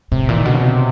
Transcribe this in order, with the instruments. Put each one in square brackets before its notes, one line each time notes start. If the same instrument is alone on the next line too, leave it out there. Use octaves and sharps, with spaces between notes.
[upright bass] A2 [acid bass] C3
[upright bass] A#2 [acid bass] E3
[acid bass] D#3
[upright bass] B2 [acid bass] D3
[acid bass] C#3
C3